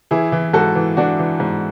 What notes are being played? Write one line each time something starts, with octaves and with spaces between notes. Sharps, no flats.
E3 E4 G#4
E3
G#2 F#4 A4
E3
E3 D4 F#4
E3
G#2